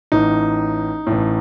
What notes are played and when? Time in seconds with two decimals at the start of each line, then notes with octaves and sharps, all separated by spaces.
0.12 A1 A2 D#4
1.07 A2
1.12 A1